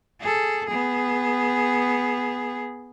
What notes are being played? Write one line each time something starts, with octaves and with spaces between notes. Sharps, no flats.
G#4 A4
B3 G#4